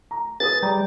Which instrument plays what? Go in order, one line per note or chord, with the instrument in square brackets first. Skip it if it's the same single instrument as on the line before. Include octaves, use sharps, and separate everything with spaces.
[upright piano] A#5
[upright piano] G#4 B4 D#6 [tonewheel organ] A6
[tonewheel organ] G3 [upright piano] D5 A#5